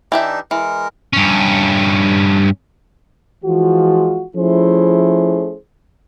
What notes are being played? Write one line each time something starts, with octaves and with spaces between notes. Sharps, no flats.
E3 D4 D#4 G4 E5
E3 G#3 A#4
G2 C#4
E3 F3 G#3 F4 F#4
F3 A3 C#4 E4 G#4 C5